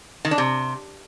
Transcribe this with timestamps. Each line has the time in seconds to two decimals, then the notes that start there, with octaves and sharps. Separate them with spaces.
0.25 D#3
0.31 D4
0.38 C3